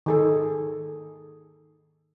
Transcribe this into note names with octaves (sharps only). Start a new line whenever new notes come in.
D#3 G#4 A4